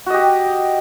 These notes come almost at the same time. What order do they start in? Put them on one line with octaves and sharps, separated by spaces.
F#4 D#5 G4